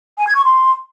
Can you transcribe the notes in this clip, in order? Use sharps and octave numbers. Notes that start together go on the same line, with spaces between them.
G#5
G#6
C#6
C6